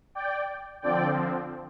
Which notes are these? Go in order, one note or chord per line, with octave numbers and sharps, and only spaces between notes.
D5 G5
D3 F3 C4 D5 G5